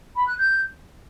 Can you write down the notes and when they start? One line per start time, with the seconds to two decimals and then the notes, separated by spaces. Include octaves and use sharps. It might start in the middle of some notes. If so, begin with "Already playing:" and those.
0.16 B5
0.27 F#6
0.38 G6